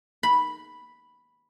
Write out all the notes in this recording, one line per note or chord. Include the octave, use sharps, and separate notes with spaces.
B5